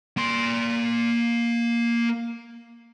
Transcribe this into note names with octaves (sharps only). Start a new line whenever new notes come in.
A#3 C6